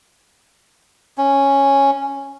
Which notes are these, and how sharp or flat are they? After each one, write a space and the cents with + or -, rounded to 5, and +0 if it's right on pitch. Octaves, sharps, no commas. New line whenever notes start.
C#4 -5